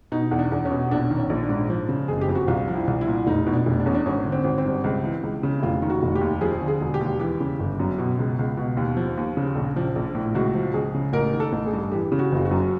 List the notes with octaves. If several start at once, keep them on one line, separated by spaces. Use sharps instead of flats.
B2 D#4
E2
D4
E2
C#4
B2
A#1 D4
D#3
C#4
A#1
D4
G#2
F3
C#3
F#1 G#4
G4
F2
F#4
C2 F4
F3
E4
C2
E4
A#2
F1 D#4
B2
D4
F1
D4
E2 C#4
D4
G#1 C#4
D3
C4
G#1
C4
G2
C#2
E3
C#2
C#3
E4
F1 F4
D#3
F#4
F1
G4
D#2
F3 G#4
D3
G#4
E1
G4
D#2
E3 G4
C#3
G1
F#2
B2
C#2
C#2
B2
D#2
F3
D#2
C#3
A#1
F3
A#1
A2
C#2 F#4
F3
C#2 G#4
C#3
A1 A#4
D#3
A4
A1
G#4
G2
E3 G4
C#3
F#4
F#1 F4
F#4
F#2